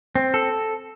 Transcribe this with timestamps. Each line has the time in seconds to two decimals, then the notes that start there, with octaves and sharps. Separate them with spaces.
0.15 C4
0.34 A4